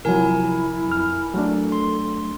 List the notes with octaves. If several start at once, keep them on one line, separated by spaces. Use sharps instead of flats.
C3 F3 F#3 E4 A#4 G#5
F2 F6
F#3 A3 D4 A4
C6